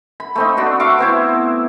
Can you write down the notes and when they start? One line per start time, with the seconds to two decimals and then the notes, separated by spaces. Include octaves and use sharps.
0.20 B5
0.36 A3 C4 D#4
0.57 D4 F#4 B4
0.80 E5 F5 C#6 D6
0.98 B3 C4 E4